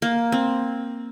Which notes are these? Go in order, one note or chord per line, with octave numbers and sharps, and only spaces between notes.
A#3
C4